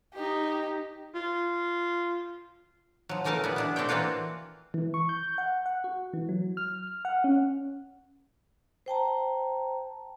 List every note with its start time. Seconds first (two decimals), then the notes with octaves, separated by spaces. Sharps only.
0.14 D#4 G4
1.15 F4
3.09 F3 F#3
3.24 C#3 E3 A3 A#4 G#5 A5
3.44 A#2 G3 B3
3.56 B3 D4 E4
3.76 A3 C4 D4 E4 C#5 G5
3.89 E3 A#3 C4 F4 F#4
4.74 E3
4.94 C#6
5.09 G6
5.38 F#5
5.66 F#5
5.84 F#4
6.13 E3
6.29 F#3
6.57 F6
6.87 F6
7.05 F#5
7.24 C#4
8.86 C5 G5 A5 A#5